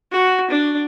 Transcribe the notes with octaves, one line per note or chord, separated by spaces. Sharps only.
F#4
D4